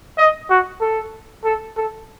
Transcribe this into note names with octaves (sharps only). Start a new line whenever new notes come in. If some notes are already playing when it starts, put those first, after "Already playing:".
D#5
F#4
A4
A4
A4